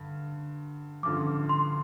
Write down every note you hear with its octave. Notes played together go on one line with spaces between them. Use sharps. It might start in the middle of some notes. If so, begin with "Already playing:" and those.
Already playing: G2 D3
A1 G2 D3 F3 D6
C6